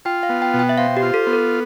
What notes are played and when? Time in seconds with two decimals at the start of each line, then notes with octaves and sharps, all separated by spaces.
0.05 F4 G5
0.23 F5
0.29 B3
0.42 G5
0.54 B2
0.59 G5
0.69 E5
0.78 C5 F5
0.97 G4
1.02 F4
1.14 A4
1.27 B3
1.33 A4